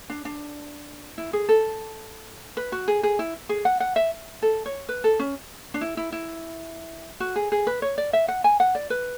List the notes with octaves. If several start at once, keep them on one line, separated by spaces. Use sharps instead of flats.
D4
D4
E4
G#4
A4
B4
F#4
G#4
G#4
E4
G#4
F#5
F#5
E5
A4
C#5
B4
A4
C#4
D4
E4
E4
E4
F#4
G#4
G#4
B4
C#5
D5
E5
F#5
G#5
F#5
D5
B4